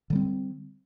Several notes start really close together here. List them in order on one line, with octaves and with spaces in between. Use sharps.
D3 G3 C4